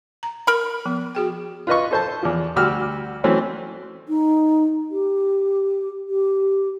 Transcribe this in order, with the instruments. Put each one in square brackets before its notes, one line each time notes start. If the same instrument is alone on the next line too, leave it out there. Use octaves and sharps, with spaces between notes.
[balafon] A#5
[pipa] A#4 B5
[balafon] F3 B3
F#4 G#4 G5
[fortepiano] F4 B4 D#5 C#6
A4 C5 A5
E2 F3
D2 G3 F#4 G4 E6 F6
E3 F#3 A3 C4 C#4
[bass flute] D#4
G4
G4